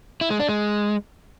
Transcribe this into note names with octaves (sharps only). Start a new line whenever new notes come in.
E4
G#3
D4
G#3